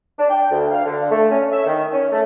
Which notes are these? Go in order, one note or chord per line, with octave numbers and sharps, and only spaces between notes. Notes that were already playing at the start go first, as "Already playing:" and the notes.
D4
G5
D2
F5
D3
A3
C#4
E5
D#3
C#4
A3